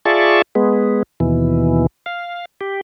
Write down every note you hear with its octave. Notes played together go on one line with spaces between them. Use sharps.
F4 G#4 D5 E5 A5 C#6
G#3 B3
D#2 B2 E3
F5
G4